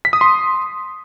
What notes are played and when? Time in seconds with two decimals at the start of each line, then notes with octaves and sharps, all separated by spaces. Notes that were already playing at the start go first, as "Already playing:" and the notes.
0.05 B6
0.13 D#6
0.21 C6